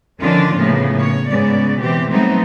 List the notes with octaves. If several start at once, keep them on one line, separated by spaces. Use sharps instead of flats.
D3 D#3 F3 C#4 D4 F4
A2 C#3 A#3 B3
C#5
G#2 C#3 B3 D5
B2 E3 C4 G4
F#3 G3 A3 B3 C4 D#4